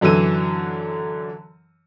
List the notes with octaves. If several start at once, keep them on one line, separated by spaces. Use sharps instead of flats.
F#2 D3 E3 F#3 E6 D#7